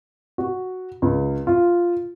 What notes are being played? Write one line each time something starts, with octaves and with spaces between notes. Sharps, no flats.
F#4
C#2
F4